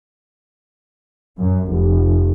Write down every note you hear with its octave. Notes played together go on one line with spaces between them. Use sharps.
F#2
F1